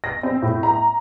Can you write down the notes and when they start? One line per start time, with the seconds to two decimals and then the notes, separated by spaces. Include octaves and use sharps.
0.04 A#6
0.23 C4
0.42 A2
0.63 A#5